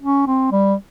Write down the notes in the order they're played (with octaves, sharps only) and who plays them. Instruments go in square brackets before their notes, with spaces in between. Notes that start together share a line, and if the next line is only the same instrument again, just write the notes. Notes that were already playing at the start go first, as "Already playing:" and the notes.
[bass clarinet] C#4
C4
G3